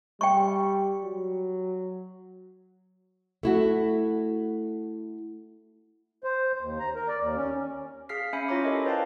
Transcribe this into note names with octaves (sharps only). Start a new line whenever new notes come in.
G3 G5 C#6
F#3
A3 E4 F#4
C5
D#2
A#5
A#4
D5
D#2
C#4
G#4 F5 F6 B6 C7
C#4 E5 G#5 B5 C#7
E4 F4 G4 C#5 A#5 D6
A4 A#4 D#5 E5
B4 C5 D5 F5 G5 A5